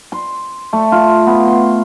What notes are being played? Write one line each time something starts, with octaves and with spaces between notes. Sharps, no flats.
C6
A3
F4
B3
C6